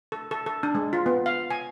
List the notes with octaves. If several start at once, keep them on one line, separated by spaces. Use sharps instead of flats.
A4
A4
A4
D4
G#3
F4
B3
F5
G#5